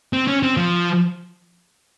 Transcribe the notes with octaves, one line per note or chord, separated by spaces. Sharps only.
C4
C#4
C4
F3